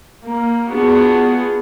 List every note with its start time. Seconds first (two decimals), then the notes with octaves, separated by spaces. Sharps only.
0.24 A#3
0.71 B3 D4 F4 F#4 G#4